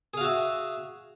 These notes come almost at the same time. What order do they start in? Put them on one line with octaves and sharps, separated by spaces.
G#4 F5 F#4 E5